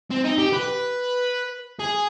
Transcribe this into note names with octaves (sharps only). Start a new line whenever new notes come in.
C4
D#4
G4
B4
G#4